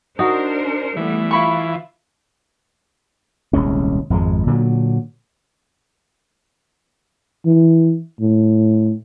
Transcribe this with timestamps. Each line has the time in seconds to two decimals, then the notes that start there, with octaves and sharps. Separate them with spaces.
0.19 D4 D#4 F#4 A#4 C5
0.97 E3 G3 A3 B3
1.31 E4 F4 B5 C#6
3.53 D#1 C2 G#3 C#4
4.10 G#1 F2 D3 G#3
4.47 A#2 D3 D#3 F#3
7.46 E3
8.20 A2